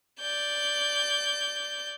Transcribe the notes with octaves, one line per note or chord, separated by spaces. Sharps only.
D5 G6